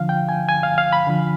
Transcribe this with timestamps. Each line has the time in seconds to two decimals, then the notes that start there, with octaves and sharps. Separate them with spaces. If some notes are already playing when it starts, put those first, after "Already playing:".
Already playing: D3 F3 F5
0.09 G5
0.29 G#5
0.49 G#5
0.63 F5
0.78 F5
0.93 B5
1.07 D3 F3